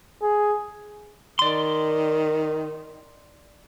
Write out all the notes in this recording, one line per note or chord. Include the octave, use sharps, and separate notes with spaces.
G#4
D#3 D5 C6